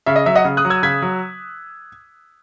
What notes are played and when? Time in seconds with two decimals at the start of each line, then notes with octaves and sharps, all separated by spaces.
0.06 C#3 E5
0.16 D#5
0.26 F#3 E5
0.35 D#5 F#5
0.45 C#3
0.57 D#6 F#6
0.65 F#3
0.70 E6 G#6
0.83 C#3 G#6 B6
1.02 F#3